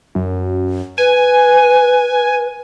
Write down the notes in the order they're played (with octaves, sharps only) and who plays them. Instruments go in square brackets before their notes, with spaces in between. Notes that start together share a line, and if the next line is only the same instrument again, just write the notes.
[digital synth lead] F#2
[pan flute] B4 [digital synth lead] G#5